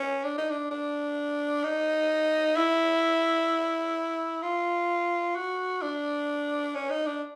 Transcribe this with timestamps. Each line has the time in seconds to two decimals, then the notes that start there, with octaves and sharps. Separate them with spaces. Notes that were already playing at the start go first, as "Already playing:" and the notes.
Already playing: C#4
0.24 D4
0.38 D#4
0.50 D4
0.71 D4
1.64 D#4
2.57 E4
4.42 F4
5.36 F#4
5.82 D4
6.75 C#4
6.90 D#4
7.06 D4